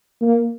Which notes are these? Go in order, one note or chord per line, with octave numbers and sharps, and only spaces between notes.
A#3